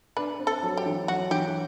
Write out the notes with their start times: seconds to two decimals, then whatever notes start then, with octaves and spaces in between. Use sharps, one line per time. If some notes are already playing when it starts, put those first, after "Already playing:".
0.17 D4 B4
0.40 C4
0.47 A4
0.63 F#3
0.77 G4
0.86 E3
1.08 F#3 F#4
1.31 E3 G4